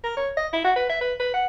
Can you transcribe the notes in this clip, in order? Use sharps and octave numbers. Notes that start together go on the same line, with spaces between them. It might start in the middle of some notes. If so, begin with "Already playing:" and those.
A#4
C#5
D#5
E4
F#4
B4
E5
B4
B4
F#5